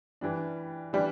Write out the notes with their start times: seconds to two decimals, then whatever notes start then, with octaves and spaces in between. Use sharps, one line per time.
0.21 E3 G3 D4
0.93 E3 G3 D4